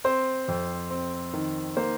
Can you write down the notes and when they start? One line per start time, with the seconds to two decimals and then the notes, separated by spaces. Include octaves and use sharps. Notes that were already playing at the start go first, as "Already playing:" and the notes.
0.04 C4 C5
0.48 F2
0.90 C4
1.34 D#3
1.77 A#3 C5